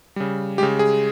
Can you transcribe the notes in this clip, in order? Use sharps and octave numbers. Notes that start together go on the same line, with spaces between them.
C#3 G3
C#3 G#3 G4
G#4